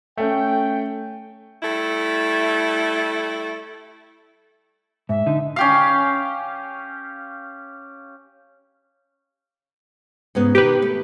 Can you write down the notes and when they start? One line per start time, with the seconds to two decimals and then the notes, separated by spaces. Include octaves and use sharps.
0.18 A3 C#4 G5
1.63 G3 A3 E4 A4
5.09 G#2 E5
5.26 D3 D#4
5.56 C#4 G4 F5
10.35 G#2 C#3 B3
10.55 B2 D#3 G4 B4
10.82 A3